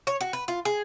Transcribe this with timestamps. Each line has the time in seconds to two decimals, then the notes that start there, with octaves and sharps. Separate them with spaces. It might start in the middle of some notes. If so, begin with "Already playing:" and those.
0.07 C#5
0.21 F#4
0.33 B4
0.48 F4
0.65 G#4